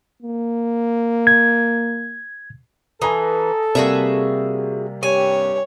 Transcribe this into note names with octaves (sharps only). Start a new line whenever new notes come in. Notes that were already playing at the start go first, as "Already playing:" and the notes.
A#3
G#6
E3 A4 G#5 A#5 D#6
C3 G3 A#3 F#4 G#4 E5
G2 G4 C#5 G#5